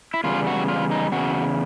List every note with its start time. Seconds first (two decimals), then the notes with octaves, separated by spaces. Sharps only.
0.14 E4
0.24 E2 C#3 G3 F4
0.47 F#4
0.68 F4
0.91 D#4
1.12 E2 C#3 F#4